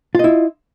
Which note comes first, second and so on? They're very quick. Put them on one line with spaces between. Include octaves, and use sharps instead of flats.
F4 D#5 E4